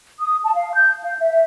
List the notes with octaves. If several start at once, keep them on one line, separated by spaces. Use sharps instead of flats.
D#6
A5
F5
G6
F5
E5